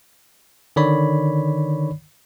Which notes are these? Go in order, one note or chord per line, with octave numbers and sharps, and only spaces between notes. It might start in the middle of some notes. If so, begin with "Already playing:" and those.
D3 D#3 C#5 D5 B5